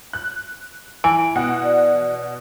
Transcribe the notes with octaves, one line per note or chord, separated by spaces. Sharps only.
F#6
E3 D7
B2 F#5
D5